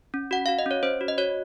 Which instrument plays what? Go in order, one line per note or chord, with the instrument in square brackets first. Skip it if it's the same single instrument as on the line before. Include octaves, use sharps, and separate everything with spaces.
[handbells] C#4
F#4 F#5
F#4 F5
D#5
C#4 C#5
C#4 C5
F#4
D#5
F#4 C#5